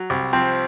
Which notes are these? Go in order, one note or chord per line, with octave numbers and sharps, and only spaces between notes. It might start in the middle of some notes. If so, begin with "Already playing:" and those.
Already playing: F#3
C2
F3 C4